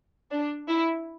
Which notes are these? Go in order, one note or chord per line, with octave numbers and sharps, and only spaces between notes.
D4
E4